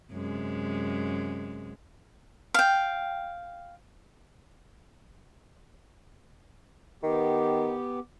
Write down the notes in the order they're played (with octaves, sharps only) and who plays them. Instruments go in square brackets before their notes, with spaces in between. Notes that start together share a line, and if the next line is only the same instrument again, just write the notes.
[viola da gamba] F#2 C3 G#3
[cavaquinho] F5 G5
[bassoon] D#3 [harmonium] B3 G4